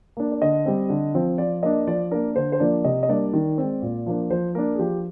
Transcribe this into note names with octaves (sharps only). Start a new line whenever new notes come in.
A#3 D4
D5
D3 D#5
G3 C4
D3
F3 C4
F3 D5
A#3 D4 D#5
F3 D5
A#3 D4 A#4
D3 C5
C5
F3 A#3 D4 D5
C3 D#5
D#5
G3 A#3 D4 D5
D#3
G#3 C4
A#2
F3 A#3 D4
F3 C5
A#3 D4 A#4
G#4
F3 G4